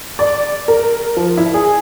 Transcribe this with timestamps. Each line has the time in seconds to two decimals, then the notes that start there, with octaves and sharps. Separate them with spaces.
0.19 D5
0.68 A#4
1.17 F3
1.38 E4
1.54 G#4